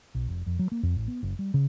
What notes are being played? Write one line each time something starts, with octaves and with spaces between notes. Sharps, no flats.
B1
F1
F2
F#3
A#3
F2
A1
B3
F#1
G3
C#3